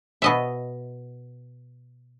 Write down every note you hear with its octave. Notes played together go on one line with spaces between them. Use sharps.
B2 D#5 E5